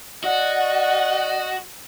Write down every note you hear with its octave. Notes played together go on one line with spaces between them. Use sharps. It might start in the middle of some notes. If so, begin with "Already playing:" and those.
F#4 D5 D#5 F#5